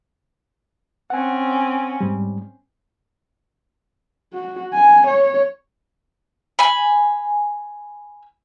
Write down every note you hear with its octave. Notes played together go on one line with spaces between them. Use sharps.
C4 C#4 F#5 G#5
G#2 G3
F#4
G#5
C#5
G#5 B5